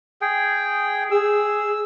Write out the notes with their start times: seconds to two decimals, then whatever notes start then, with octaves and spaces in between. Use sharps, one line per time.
0.22 G#4 G5
1.11 G#4 E6